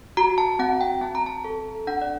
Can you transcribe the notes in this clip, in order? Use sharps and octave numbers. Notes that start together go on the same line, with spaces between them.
F#4 A#5
A5
C4 F#5
G5
C4 A5
A#5
A5
A4
D4 F#5
D5